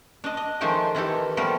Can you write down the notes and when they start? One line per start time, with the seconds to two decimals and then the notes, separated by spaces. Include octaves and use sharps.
0.24 D4 D#5
0.37 D#5
0.61 D#3 F3 G#3 A3 D#4 G5
0.95 D#3 E3 G4 A4
1.37 F3 G3 A3 B3 A#4